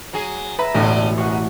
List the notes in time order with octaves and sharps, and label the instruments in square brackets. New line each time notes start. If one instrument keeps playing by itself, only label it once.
[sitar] F#3 G#4
[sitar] B4 [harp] E5 A#5 A#6
[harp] E1 A1 A2 [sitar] D3 C#4
[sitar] F#2 [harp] F#5 C#6